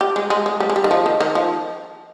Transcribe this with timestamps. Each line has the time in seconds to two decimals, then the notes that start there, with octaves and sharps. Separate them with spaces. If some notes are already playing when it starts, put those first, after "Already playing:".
0.01 G4
0.16 G#3
0.30 G#3
0.46 G#3
0.60 G3
0.69 G#3
0.76 G3
0.84 D#3
0.91 F3
1.06 D#3
1.20 D#3
1.35 F3